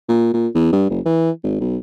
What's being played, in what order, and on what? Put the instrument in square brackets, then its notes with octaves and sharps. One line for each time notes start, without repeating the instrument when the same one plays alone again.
[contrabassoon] A#2
A#2
E2
G2
F#1
E3
G#1
B1